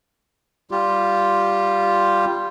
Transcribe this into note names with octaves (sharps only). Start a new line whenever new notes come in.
G3 F4 G4